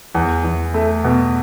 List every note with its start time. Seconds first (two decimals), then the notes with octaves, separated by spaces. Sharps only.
0.15 E2
0.44 E2
0.74 A3
1.04 B2